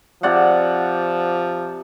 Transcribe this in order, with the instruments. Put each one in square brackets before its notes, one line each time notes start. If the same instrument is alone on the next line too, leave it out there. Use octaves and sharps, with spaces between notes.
[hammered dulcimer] C3 D5 F#5 [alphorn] F3